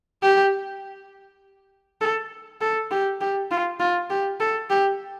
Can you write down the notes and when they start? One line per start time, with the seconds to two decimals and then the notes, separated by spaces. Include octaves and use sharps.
0.22 G4
2.01 A4
2.61 A4
2.91 G4
3.21 G4
3.51 F4
3.80 F4
4.10 G4
4.40 A4
4.70 G4